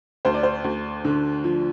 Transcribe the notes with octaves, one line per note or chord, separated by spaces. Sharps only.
D2 C5
D5
C5
D2
D3
F3